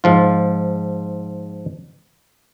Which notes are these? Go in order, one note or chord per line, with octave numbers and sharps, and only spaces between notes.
G#2 F3 F4